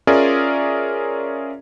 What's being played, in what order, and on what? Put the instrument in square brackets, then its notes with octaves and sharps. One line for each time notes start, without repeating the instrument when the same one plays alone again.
[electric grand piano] C#4 F4 G#4 A#4 D5 E5